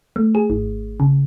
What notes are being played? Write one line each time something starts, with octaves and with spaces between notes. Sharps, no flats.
A3
G#4
G#1
C#3